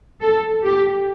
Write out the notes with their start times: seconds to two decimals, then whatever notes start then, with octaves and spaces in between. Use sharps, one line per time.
0.21 A4
0.64 G4